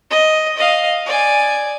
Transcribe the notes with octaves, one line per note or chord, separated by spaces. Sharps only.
D#5
D#5 F5
D5 G#5